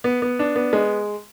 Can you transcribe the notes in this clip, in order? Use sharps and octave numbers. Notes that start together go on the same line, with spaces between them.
B3
B3
D4
B3
G#3